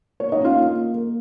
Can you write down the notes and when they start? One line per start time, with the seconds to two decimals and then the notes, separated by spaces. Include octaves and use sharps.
0.20 A#3 C#5
0.32 D#4 D#5
0.39 C#4
0.44 F4 F5
0.57 A#3
0.75 A#3
0.94 A#3